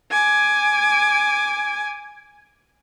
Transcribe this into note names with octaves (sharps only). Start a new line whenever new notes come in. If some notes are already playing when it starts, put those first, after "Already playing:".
G#5 D6